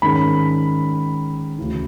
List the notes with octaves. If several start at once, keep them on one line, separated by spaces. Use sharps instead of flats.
G#2 D#3 G#3 C#4 B5
D2 C#3 E3